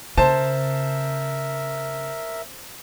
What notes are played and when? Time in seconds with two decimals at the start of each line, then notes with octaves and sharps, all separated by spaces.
0.17 C#3 A#4 C5 E5 A5